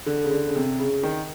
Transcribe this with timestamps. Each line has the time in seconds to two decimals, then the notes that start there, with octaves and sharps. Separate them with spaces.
0.06 D3
0.24 C#3
0.31 D3
0.47 C#3
0.55 C3
0.79 C#3
1.03 D#3